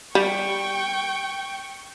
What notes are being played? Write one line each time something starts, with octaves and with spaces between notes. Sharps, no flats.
G3 G5 C#6